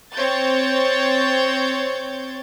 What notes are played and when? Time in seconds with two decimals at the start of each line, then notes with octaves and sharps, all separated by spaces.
0.13 C4 C#5 G6 A6